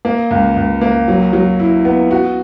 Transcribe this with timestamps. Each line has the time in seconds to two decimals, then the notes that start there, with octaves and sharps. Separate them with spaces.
0.05 A#3
0.31 C#2
0.56 C#2
0.81 A#3
1.08 F#3
1.33 F#3
1.60 E4
1.85 B3
2.11 F#4